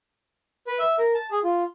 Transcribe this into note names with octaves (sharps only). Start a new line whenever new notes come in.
B4
E5
A#4
A5
G#4
F4